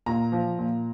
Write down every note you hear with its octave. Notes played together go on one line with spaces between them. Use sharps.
A#2 A#5
F3
A#2